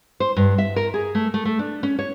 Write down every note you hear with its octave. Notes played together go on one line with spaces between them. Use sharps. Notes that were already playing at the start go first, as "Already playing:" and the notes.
C5
G2
E5
A#4
G#4
A3
A3
A3
D4
C#4
C#5